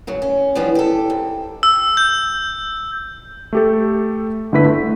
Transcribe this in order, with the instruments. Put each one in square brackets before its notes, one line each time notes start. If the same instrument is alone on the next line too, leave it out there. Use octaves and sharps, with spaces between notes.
[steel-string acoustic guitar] G#2 C#3 F#3
C#4
E3 F3 G3 B3 C#4 D4
G4 A4
G#2
[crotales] E6
G6
[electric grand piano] A3 G4 A4
G1 D3 A3 E4 B4 B6
A3